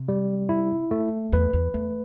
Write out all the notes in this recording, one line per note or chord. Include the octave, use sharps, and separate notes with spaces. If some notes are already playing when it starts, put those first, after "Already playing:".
Already playing: C3
G3
E4
A3
E2 B4
E2
E2 A3